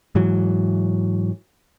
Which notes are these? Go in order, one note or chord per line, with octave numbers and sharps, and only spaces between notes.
G#2 E3 F#3